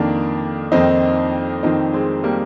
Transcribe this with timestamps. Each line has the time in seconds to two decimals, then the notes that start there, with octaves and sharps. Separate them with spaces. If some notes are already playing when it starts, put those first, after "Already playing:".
Already playing: F2 D#3 A#3 D4
0.72 F2 D#3 C4 D#4
1.63 F2 D#3 C4 D#4
1.94 G#3 C4
2.23 G3 A#3